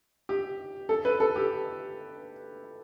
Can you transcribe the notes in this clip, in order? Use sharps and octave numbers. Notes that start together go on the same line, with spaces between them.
G4
A4
B4
A4
G4